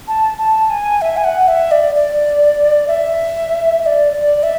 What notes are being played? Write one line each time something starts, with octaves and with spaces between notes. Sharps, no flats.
A5
A5
G#5
E5
G#5
F#5
E5
D5
D5
E5
E5
D5
D5
E5